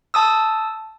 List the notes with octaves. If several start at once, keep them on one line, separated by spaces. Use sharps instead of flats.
A5 D#6 E6